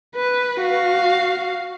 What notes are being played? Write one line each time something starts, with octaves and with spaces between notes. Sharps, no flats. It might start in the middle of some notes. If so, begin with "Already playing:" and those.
B4
F#4 F5